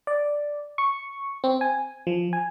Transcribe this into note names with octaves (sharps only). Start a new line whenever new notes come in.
D5
C#6
C4
G#5
F3
G#5